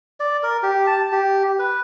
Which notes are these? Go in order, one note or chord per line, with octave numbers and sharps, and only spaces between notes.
D5
A#4
G4
A5
G4
B4